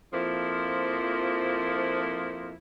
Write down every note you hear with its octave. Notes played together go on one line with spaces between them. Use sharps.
F2 F3 A#3 E4 C5